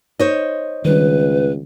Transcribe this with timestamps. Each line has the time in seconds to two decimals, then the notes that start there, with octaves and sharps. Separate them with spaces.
0.19 D#4 C5 C#5 D#5
0.85 C#2 D#3 G3 D4 B4